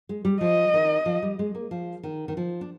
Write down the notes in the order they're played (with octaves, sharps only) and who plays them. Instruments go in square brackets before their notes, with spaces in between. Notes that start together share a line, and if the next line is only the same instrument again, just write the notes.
[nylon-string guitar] G#3
G3
[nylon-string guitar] F3 [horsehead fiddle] D#5
[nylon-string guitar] D#3
F3
G3
G#3
A#3
F3
D#3
D#3
F3
D4